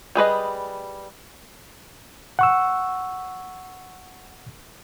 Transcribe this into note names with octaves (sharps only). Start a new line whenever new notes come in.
G3 G#4 B4 D#5
F#5 C#6 E6